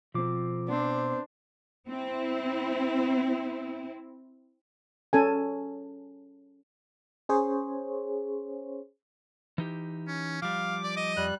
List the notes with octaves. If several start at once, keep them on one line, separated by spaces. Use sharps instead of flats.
B2 F3 C4 D6
B3 C4 D4 C5
C4 E4
C#4 A4 G#5
C#4 G#4 C5 C#5
E3 D#4 G4
C#4
F3 G3 F5 D6
D5
D#5
F2 G3 F#6